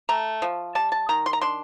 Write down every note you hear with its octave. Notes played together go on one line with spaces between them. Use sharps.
A3 A#5
F3
G3 A5
A5
D#3 A#5
C6
A#5
D4 C6